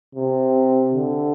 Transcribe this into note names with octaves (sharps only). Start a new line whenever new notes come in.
C3
D3